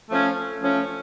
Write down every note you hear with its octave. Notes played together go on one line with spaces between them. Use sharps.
F3 A3 C#4
F3 A3 C#4